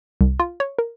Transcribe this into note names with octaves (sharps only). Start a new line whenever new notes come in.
C2
F4
C#5
A#4